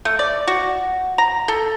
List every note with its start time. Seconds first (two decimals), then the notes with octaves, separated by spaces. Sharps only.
0.05 A3
0.19 D5
0.48 F#4
1.18 A#5
1.48 A4